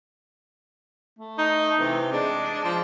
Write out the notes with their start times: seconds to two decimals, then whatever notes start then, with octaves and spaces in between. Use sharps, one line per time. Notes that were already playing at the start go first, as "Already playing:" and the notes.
1.19 A3
1.38 D#4
1.79 C3 E3
2.12 G#3 D4
2.64 F3